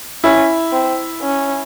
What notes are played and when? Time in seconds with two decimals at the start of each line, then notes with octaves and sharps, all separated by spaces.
0.24 C#4 E4
0.72 C4
1.22 C#4